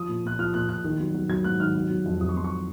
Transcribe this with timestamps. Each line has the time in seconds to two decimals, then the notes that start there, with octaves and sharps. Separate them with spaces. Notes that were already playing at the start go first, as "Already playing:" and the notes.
Already playing: F3 D#6
0.09 A#2
0.24 A#2 F#6
0.39 F3 F6
0.54 A#2 F#6
0.69 A#2 F#6
0.84 D#3
1.00 F#3
1.14 F#3
1.29 F#3 G#6
1.44 G#2 F#6
1.60 D#3 F6
1.75 F#3
1.91 F#3
2.06 F2
2.21 F2 D#6
2.29 C#6
2.36 F#3 C6
2.44 C#6